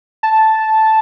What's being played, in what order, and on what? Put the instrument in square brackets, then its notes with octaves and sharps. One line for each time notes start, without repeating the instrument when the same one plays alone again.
[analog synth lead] A5